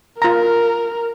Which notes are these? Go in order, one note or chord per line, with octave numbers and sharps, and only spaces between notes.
F4 A#4 A#5